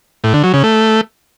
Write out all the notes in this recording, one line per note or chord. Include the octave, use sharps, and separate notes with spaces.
A2
D3
F#3
C#3
A3